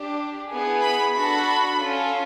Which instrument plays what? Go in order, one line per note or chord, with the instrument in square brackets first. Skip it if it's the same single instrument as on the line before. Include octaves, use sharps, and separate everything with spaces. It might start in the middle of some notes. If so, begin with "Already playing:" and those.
Already playing: [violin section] D4 G4
B3 E4 G#4
B5
D4 F#4 A4 B5
C#4 F4 A4